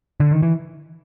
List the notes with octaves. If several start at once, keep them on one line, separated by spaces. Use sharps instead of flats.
D3
D#3
E3